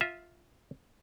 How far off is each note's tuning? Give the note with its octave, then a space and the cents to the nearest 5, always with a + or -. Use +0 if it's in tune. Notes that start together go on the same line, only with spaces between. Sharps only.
F4 +0 E5 -20